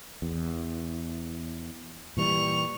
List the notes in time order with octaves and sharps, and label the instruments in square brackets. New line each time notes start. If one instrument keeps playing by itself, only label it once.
[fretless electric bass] E2
[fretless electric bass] A#2 E3 G3 [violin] C#6 F7